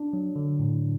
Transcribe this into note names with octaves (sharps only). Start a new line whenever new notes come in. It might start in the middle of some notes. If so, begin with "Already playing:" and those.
Already playing: D4
F#3
D3
A2